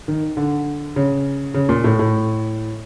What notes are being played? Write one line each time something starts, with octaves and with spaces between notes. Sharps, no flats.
D#3
D3
C#3
C#3
A#2
A2
A2